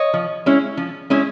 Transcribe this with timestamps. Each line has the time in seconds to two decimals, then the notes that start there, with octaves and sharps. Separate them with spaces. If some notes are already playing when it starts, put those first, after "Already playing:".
Already playing: C#5 D#5
0.14 F3
0.46 G#3 C#4 E4
0.77 F3
1.10 G#3 C#4 E4